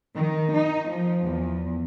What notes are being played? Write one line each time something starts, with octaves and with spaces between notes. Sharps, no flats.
D#3
D#4
F3
E2